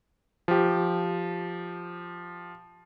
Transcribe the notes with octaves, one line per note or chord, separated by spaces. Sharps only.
F3 G4